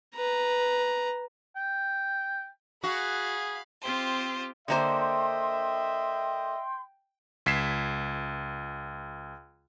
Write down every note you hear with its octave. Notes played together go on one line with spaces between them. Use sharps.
B4 A#5
G5
F#4 G#4 F5 B5
C4 F4 G4 C5
D3 A#3 C5 D#5 E5 G5 C6
C#2 G#6 B6 C7 E7